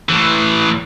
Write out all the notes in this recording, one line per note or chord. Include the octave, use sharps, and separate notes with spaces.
A2 E3